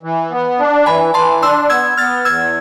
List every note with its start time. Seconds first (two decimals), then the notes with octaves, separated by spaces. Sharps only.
0.03 E3
0.31 B3
0.59 D4
0.86 E3 G#5 B5
1.14 E3 A5 C6
1.42 D4 C6 E6
1.70 B3 E6 G#6
1.97 B3 F6 A6
2.25 E2 E6 G#6